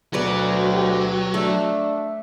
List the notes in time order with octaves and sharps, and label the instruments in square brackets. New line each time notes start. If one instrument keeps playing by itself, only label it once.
[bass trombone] D2 [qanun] B2 B4 D5 [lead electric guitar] F#3
[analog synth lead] G4
[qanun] A3 [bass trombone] D4 [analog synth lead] E5